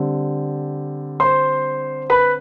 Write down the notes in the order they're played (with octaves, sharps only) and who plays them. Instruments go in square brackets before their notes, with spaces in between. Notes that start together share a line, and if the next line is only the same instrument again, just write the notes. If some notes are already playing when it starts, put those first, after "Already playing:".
Already playing: [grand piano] D3 G3 C4
C5 C6
B4 B5